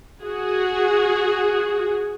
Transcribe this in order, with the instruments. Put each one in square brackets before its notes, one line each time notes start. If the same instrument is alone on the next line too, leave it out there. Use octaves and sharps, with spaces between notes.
[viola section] F#4 G#4